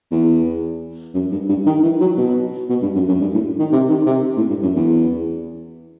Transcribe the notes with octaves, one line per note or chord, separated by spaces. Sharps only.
E2
F#2
G2
G2
D#3
E3
F#3
B2
B2
G2
F#2
F#2
G2
A2
D#3
C3
D#3
C3
A2
G2
F#2
E2